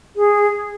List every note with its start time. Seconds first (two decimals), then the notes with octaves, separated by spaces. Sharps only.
0.16 G#4